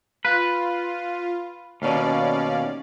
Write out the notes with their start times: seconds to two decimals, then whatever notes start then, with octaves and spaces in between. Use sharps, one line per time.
0.25 F4 B4
1.82 D#2 B2 C#4 D5 F5